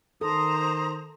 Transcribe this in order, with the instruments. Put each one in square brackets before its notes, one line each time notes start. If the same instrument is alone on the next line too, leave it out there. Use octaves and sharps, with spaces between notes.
[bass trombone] D#3 [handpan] A4 [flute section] C5 A#5 [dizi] D#6